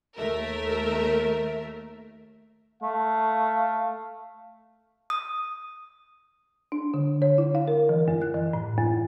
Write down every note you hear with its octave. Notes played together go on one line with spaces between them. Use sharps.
D#2 A3 A#4 E5
A3 F5
D#6
D4
D3
C#5
E4
F5
A#4
E3
F#2
F#6
E3
A2
F#2